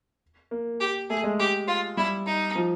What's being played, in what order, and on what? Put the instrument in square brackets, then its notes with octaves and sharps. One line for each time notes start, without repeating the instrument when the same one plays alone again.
[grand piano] A#3
[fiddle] G4
[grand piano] A3 [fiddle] G#4
[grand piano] G#3
[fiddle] G4
F4
[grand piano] G3 [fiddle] E4
[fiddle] D#4
[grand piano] F3